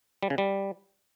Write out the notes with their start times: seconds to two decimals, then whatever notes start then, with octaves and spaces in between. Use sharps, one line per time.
0.23 G3
0.30 C#3
0.38 G3